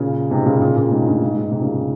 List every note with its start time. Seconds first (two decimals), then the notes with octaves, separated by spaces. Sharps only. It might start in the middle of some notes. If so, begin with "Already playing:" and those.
Already playing: A#2 C#3
0.30 G#2 C3
0.46 A#2 C#3
0.61 A#2 C#3
0.76 A#2 C#3
0.92 G#2 C3
1.06 G2 A#2
1.21 G#2
1.36 G#2
1.52 G#2 C3
1.61 A#2 C#3